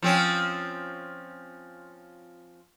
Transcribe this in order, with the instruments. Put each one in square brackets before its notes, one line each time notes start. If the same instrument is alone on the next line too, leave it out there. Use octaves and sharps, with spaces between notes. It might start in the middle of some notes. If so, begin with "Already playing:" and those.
[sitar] F3 C4 C#4